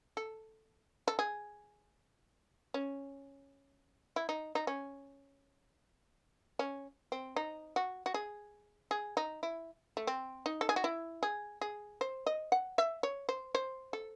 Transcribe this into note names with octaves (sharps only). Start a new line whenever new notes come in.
A4
A4
G#4
C#4
E4
D#4
D#4
C#4
C#4
C4
D#4
F#4
F#4
G#4
G#4
D#4
E4
A3
C4
D#4
A4
G#4
F#4
E4
G#4
G#4
C5
D#5
F#5
E5
C#5
C5
C5
A4